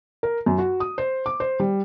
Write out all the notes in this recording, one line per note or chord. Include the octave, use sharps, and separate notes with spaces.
A#4
F#2
F#4
D#6
C5
D6
C5
G3